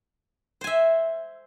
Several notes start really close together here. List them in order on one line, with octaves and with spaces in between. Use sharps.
C5 G#5 E5